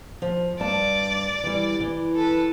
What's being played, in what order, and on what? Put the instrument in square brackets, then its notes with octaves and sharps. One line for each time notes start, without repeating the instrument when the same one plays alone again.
[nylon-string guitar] F3
[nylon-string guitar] G2 A5 [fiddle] D5
[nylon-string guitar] E3 G3
E3
[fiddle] A4 B4